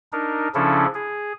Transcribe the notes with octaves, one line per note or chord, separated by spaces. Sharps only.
D4 D#4 A#4
C#3 F3 C#4 D4 E4 A4
G#4